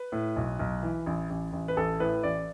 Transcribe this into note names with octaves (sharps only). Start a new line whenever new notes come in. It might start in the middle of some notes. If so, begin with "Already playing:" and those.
Already playing: B4
A2
B1
B1
E3
A1
A1
A1
B4
A1 A4
A2 B4
A1 D5